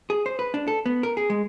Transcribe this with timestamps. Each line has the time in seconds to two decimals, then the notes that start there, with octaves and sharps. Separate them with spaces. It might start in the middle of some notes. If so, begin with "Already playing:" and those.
0.10 G#4
0.26 C5
0.39 B4
0.54 D4
0.68 A4
0.86 B3
1.03 A#4
1.17 G#4
1.30 G#3